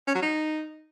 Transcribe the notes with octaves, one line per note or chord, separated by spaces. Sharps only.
C#4
F#3
D#4